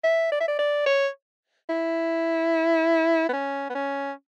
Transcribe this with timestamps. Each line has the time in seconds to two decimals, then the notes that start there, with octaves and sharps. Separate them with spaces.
0.04 E5
0.32 D5
0.40 E5
0.48 D5
0.59 D5
0.86 C#5
1.69 E4
3.29 B3
3.33 C#4
3.70 B3
3.75 C#4